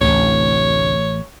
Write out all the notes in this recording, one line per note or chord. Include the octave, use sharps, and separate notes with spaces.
A1 D2 C3 C#5